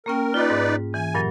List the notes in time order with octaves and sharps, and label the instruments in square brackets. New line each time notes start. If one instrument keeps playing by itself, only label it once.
[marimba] A#3 C#4 G5 [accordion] A#4
[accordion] D#4 B4 D5 [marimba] F4
[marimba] G#2
[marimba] E3 [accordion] G#5
[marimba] G2 A#2 F#3